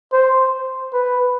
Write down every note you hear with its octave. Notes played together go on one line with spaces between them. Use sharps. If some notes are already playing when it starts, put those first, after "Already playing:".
C5
B4